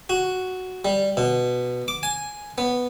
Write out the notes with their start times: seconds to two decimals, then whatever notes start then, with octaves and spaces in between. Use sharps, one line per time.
0.10 F#4
0.85 G3
1.17 B2
1.88 D6
2.03 G#5
2.58 B3